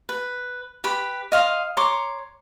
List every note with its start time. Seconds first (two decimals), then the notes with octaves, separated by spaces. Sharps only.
0.09 B4
0.84 G4 B4 B5
1.32 D#5 F5 C6
1.77 C#5 A#5 C6 D6